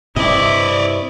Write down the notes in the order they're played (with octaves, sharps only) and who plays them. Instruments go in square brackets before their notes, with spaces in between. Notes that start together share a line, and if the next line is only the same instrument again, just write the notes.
[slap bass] G2 C3 [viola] E4 [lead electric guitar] D5 D#5